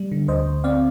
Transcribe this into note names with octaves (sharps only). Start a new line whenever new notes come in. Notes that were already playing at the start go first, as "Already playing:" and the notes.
Already playing: G3
D3
D2 C5 D#5
D2
C4 D5 F5